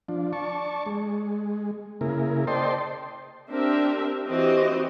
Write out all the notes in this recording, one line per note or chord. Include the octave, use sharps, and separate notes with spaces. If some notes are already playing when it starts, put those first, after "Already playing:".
F3 D4
D5 A5 C#6
G#3
C#3 A#3 E4 G#4 A#4
C5 D5 D#5 G5 A5 C6
C4 D4 G4 A#4 E5
E3 C4 F#4 G4 D#5